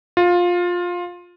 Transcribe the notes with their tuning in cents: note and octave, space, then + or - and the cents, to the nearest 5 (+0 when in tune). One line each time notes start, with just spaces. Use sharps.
F4 +15